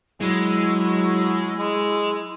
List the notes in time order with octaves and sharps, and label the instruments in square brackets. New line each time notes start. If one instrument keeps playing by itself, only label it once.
[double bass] F#3 [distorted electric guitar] G#3 [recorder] E4
[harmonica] G#3